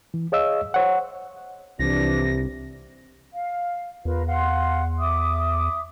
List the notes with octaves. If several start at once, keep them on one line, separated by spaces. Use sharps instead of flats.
E3
G#4 C#5 D#5 F5 E6
C5 C#5 F#5
C2 C3 E3 F3 D4 A#6
F5
E2 F4 A#4 B4
F5 F#5 C6
E5 D6 D#6